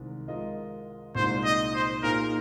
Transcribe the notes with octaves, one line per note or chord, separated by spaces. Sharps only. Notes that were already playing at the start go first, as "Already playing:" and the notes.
Already playing: C2 C3 D#3 G#3
F3 G#3 F4 A#4 D#5
C2 A#2 G#3 D#4 C5
D#5
C5
A#2 A#3 D#4 G#4 A#4 C5